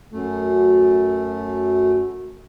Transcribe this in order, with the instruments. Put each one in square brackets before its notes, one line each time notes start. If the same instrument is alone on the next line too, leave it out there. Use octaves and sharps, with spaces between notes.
[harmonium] F#2 A3